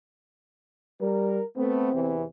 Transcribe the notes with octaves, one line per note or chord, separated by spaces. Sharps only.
G3 A#4
A3 B3 C4
E2 C3 E3